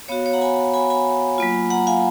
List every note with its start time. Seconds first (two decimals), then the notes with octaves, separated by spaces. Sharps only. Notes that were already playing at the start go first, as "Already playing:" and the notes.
0.08 B3 F#4 C#5 F5
0.25 C#5 F5
0.33 F#5 A#5
0.41 G#5 B5
0.74 G#5 B5
0.90 G#5 B5
1.38 F#3 A#3 F4
1.70 F#5 A#5
1.87 F5 G#5